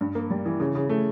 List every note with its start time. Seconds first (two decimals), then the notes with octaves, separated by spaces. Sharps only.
0.01 G2
0.15 A#3
0.30 G3
0.46 E3
0.60 C#3
0.75 C#3
0.89 A3